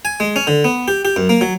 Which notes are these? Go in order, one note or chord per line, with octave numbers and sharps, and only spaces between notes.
G#5
G#3
C#4
D3
B3
G4
G4
F#2
A#3
F#3